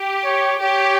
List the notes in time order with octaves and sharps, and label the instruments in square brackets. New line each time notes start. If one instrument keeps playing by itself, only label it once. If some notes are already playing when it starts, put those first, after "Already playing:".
Already playing: [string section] G4
[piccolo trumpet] C#5
[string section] G4 [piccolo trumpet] C#5